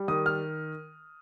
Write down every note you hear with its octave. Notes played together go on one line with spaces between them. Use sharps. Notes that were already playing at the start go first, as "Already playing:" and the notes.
Already playing: G3
D#3 D#6
F6